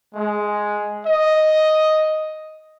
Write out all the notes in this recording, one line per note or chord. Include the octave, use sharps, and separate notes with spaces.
G#3
D#5